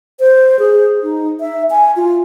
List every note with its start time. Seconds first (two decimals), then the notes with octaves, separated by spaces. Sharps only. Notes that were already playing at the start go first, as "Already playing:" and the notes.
0.20 C5
0.59 G#4
1.03 D#4
1.40 E5
1.71 G#5
1.96 F4